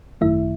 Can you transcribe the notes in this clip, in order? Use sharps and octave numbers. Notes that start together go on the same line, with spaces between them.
G#1 F#2 D#3 A3 E4 E5